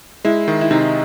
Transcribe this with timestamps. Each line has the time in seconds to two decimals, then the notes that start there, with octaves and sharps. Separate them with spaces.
0.25 G#3 E4
0.48 D#3
0.61 E4
0.71 C3 D#4